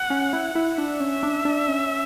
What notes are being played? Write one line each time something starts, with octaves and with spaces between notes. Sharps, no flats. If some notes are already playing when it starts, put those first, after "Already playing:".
Already playing: F#5
C#4
E4
E4
D4 E5
C#4
D4
D4
C#4